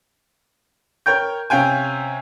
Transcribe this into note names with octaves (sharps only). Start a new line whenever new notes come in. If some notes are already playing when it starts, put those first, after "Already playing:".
A#4 C#5 G5 G6
C3 C#4 F5 G5 G#5